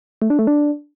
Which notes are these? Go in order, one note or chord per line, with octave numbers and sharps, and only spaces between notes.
A3
D4
A3
D4